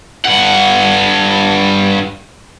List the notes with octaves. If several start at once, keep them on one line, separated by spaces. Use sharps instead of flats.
G2 F#5